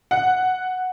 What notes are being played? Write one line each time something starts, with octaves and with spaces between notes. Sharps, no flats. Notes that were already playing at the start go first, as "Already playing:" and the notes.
F#5